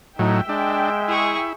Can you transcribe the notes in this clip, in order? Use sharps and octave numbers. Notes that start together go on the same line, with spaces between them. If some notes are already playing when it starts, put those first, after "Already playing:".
A2 F#3 D#4 E5 G5
G#3 D4
E4 G#4 C#6